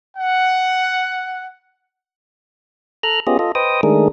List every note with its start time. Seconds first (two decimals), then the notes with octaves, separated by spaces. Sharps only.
0.17 F#5
3.03 A4 A#5 F6 F#6
3.27 B3 C#4 F4 G4 G#4 D#5
3.39 F4 A4 D#5
3.55 B4 C5 D#5 G5 D#6
3.83 D#3 G#3 A3 D4 G#4 A#4